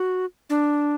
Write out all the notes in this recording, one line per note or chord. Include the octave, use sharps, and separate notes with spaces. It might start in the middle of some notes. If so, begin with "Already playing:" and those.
Already playing: F#4
D4